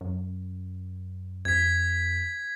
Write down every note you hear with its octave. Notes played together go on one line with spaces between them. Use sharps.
F#2
F2 G#6 B6